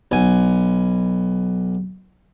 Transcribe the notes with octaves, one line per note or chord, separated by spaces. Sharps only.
B1 G#5